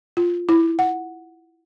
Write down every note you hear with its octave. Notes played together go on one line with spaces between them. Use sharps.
F4
E4
F#5